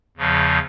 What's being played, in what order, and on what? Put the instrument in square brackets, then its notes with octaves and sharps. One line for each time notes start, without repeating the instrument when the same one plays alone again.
[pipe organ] E2 C#3 F3